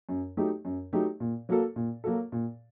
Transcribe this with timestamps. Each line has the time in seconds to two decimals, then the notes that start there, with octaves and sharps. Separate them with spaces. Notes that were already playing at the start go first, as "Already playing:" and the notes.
0.09 F#2
0.37 F#3 A3 D#4 G4
0.65 F#2
0.93 F#3 A3 D#4 G4
1.20 A#2
1.49 F#3 A#3 F#4 A4
1.76 A#2
2.04 F#3 A#3 F#4 A4
2.32 A#2